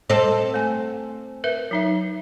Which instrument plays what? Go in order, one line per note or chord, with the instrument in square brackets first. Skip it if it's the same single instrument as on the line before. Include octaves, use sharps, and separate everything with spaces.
[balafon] G3 [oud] C4 A4
[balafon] A3 G#5
A#4 B4 E5
F#3 D#4 E5